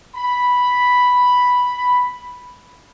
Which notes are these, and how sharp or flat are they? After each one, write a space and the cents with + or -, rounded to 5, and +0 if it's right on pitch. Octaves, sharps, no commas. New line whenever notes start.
B5 +0